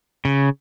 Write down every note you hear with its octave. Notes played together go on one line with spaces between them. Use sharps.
C#3